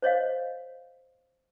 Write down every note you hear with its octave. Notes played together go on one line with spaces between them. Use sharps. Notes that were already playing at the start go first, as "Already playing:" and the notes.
C5 C#5 D#5 F5